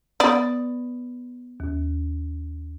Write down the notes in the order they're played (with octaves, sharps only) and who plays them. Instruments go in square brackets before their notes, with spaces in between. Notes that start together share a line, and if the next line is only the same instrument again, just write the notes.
[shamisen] B3 D5
[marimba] D#2